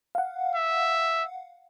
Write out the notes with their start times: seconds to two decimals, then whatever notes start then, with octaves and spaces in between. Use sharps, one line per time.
0.15 F5 F#5
0.55 E5